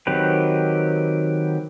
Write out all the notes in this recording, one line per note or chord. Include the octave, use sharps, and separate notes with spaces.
D#3 F#3 C4 G4 B4